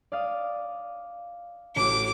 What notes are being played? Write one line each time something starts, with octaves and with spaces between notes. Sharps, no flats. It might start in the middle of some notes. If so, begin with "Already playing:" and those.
D5 F5 D#6
A1 F#4 D6